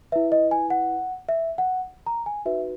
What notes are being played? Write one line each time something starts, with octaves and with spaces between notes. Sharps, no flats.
E4 B4 E5
D#5
G#5
F#5
E5
F#5
A#5
G#5
D#4 F#4 B4 E5